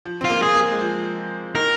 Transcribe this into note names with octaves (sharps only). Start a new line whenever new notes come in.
F3
C4 F4
A#3
G#4
A#3
G#3
F3
D#3 A#4